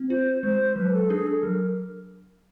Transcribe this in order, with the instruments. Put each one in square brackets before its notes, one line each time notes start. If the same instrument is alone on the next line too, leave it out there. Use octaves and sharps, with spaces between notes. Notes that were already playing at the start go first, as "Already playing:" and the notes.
Already playing: [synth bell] C4
[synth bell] F4 [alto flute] C5
[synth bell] G#3 [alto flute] C5
[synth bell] F#3 [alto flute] B4
[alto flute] A4
[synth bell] D4 [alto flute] G#4
[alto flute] A4
[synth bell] F#3 [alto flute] A#4